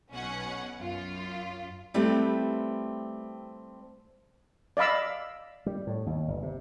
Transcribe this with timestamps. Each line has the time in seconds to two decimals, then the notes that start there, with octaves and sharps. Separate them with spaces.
0.12 B1 B2 C#4 F#5
0.78 F#2 F4
1.94 G3 A3 C4 E4 G4 B4
4.77 D5 D#5 F5 B5 E6
5.66 G3
5.87 A2
6.06 D#2
6.28 G1
6.43 C3